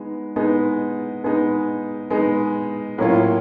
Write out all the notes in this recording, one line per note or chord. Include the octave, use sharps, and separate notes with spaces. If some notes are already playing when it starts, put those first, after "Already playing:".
Already playing: G#3 B3 D#4
G#3 B3 D#4
G#3 B3 D#4
G#3 B3 D#4
A2 F#3 A#3 C#4 F4